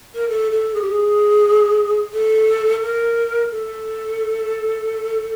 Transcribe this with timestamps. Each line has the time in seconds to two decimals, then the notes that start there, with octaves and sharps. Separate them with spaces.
0.15 A#4
0.29 A4
0.51 A4
0.74 G#4
0.81 G4
0.89 G#4
2.13 A4
2.82 A#4
3.52 A4